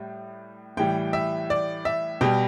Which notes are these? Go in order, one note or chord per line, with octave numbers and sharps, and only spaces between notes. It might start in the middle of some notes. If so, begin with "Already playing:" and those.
Already playing: A2 G3
A2 E3 G3 G5
E5
D5
E5
B2 G3 G5